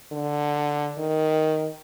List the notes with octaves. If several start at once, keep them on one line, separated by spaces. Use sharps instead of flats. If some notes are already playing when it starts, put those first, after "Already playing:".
D3
D#3